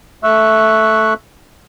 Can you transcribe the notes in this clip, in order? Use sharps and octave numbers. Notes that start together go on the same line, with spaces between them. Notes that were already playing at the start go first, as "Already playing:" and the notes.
A3 E5 C#6 E6 F#6